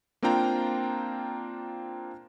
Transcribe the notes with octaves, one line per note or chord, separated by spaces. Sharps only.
A#3 C4 D4 F4 G5 A#5